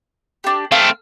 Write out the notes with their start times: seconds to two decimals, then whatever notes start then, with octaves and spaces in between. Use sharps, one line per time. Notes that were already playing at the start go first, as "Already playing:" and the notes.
0.44 D4 G4
0.72 A3 C4 F5